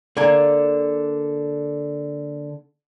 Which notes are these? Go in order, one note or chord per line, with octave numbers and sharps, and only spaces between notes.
D3 A#3 G#5